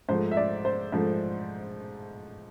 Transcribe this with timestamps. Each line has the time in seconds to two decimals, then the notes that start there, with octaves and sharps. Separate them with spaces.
0.09 G#2 F3 A3 C5
0.31 E5
0.37 D5
0.65 C5
0.92 G#2 F3 A3